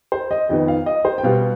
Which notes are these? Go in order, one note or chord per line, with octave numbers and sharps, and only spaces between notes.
C5
D#5
F2 D#3 B3 D#5
F5
D#5
C5
G5
B2 G3 B3 F5